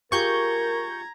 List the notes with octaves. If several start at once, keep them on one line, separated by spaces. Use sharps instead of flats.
F4 G4 G#4 A#4 A#5 C#6 G6 G#6